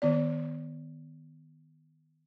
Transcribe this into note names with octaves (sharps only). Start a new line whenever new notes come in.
D#3 B3 D5